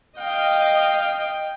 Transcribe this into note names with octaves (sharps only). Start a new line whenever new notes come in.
D#5 F5 G5